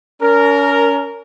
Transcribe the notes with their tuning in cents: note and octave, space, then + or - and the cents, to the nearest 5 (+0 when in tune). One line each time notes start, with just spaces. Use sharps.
C#4 +35 A#4 -5